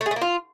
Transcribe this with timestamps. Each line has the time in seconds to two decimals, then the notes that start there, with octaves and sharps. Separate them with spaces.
0.01 A3
0.06 G#4
0.11 A3
0.16 A#3
0.21 F4